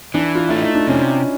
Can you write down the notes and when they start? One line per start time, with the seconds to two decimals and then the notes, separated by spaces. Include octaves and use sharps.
0.14 E3 D4
0.35 F4
0.49 A3 E4
0.61 D#4
0.75 D4
0.88 C3 C#4